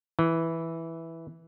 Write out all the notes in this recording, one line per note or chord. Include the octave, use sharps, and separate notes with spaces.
E3